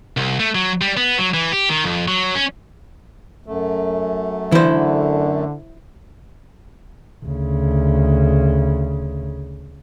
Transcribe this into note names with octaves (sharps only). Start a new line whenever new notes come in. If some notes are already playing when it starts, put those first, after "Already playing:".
C2
A3
F#3
G3
B3
F#3
E3
G4
D#3
F2
F#3
C#4
F#2 A3
D3 E3 E4 C5
D2 C#3